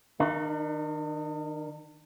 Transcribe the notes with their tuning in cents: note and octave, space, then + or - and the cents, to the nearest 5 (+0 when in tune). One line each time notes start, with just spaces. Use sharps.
D#3 +0 D4 +45